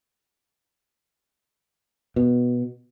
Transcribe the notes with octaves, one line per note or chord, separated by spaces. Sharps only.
B2